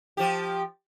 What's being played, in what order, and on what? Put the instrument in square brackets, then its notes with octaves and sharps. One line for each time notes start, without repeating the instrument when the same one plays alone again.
[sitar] F3 G4